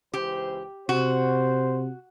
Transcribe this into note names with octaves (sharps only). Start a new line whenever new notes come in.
C#2 E3 G4 C5
C3 F#4 C5